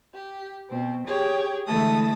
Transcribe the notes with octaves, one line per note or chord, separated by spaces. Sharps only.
G4
B2 C4
G4 G#4 C#5
D3 E3 G#3 A3 A4 D#6